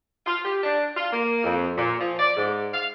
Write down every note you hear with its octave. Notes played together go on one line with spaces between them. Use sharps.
F4
G4
D4
F4
A#3
F2
A#2
F3
D5
G#2
F5